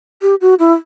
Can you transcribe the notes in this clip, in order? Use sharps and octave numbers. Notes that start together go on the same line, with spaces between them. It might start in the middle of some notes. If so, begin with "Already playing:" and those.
G4
F#4
E4